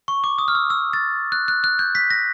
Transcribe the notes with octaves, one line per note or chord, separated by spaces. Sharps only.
C#6
D6
D#6
F6
E6
E6
A6
F#6
F#6
F#6
G6
B6
A#6